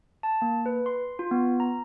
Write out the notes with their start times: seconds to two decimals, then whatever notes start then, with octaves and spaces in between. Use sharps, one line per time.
0.23 A5
0.42 A#3
0.66 B4
0.86 C6
1.19 F4
1.31 B3
1.60 A#5